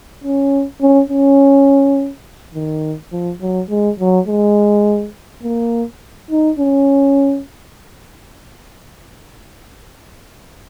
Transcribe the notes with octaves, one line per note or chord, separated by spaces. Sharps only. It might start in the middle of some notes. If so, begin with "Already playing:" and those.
C#4
C#4
C#4
D#3
F3
F#3
G#3
F#3
G#3
A#3
D#4
C#4